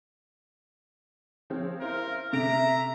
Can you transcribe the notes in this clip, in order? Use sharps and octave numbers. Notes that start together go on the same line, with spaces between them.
F3 C4 C#4
E4 A#4 C5 F5
C3 A3 E5 A#5 D7